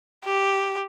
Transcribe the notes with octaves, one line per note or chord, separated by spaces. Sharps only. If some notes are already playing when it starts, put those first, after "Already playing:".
G4